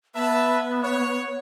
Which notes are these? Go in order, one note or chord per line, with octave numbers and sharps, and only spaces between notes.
B3 B4 E5 A5
C#5